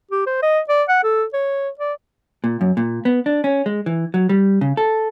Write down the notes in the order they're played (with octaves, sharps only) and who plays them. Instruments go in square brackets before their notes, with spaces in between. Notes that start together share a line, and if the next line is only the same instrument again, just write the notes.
[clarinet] G4
C5
D#5
D5
F#5
A4
C#5
D5
[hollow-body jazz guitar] A#2
F#2
A#2
B3
D4
C#4
G#3
E3
F#3
G3
C#3
A4